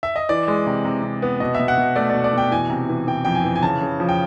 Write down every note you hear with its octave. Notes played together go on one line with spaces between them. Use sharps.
E5
D#5
E3 D5
G#3
C3
C3
C3
B3
B2 D#5
B2 E5
F#5
B2
A3 D5
B2 D5
D5
B2 G5
E3 G#5
C3
E3
E3 G5
F2 G5
G#5
E3
G#5
C#3 A5
C#3
F3
G5